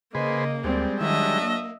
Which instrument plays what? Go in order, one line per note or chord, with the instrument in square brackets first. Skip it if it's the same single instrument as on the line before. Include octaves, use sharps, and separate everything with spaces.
[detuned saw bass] C#3 [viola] A#3 [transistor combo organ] G#4 B4 C5 [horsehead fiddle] D#5
[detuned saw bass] D2 [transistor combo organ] G3 G#3 [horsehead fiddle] C4 D5
[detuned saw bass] D#3 [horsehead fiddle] F#3 D4 [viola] D#5 E5
[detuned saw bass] A#3